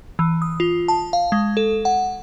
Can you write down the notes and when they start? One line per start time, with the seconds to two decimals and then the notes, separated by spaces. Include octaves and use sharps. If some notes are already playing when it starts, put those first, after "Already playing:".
0.19 E3
0.42 D#6
0.60 F4
0.88 A5
1.13 F5
1.32 G#3
1.57 A4
1.85 F#5